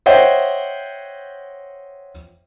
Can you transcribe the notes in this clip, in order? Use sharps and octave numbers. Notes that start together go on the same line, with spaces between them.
C5 C#5 D#5 E5 F#5 G5